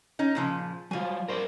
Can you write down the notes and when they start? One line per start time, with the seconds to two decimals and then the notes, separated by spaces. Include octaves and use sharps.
0.19 C#4 D#4
0.35 A#2 C#3 F3
0.91 F#3 G3 F4 G#5
1.28 A#4 C5 D5